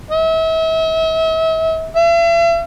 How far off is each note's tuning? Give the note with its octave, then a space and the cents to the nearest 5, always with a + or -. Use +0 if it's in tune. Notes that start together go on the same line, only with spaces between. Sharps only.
E5 -40
E5 +45